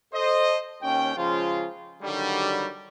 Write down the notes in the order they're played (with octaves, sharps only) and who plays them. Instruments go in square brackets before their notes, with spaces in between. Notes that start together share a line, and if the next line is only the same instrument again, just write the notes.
[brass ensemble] A4 C5 D#5
D#2 C#4 C#5 G5
C#3 F3 G#3 F4
D3 D#3 F#3 G3